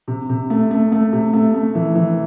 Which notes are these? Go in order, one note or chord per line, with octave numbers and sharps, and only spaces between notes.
C3
C3
A3
A3
A3
C3
A3
A3
E3
E3